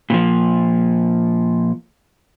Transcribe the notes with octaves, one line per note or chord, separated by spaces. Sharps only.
A#2 D#3 F3